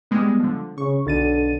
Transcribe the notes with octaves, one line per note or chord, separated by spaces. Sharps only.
G3 G#3 B3
D3 F3
C#3 C#6
B1 D3 A6 D#7